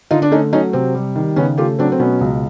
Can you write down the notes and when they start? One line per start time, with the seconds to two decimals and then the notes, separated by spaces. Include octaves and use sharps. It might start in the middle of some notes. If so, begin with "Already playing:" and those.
0.11 D3 D#4 F4
0.22 D4
0.32 A3 C#4 D#4
0.53 F#3 C#4 D#4
0.73 C3 C4
0.95 G3
1.16 D#3
1.36 C#3 B3 C#4
1.58 A3 F4 G4
1.79 F#3 C4 D4
1.92 C4
1.99 B2 B3 C#4
2.21 C#2